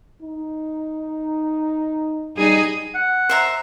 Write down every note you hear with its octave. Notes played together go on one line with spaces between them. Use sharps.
D#4
G3 D#4 G#4
F#5
C5 E5 A#5